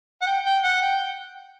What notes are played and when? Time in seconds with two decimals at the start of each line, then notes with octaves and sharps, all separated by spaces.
0.22 F#5
0.27 G5
0.46 G5
0.64 F#5
0.82 G5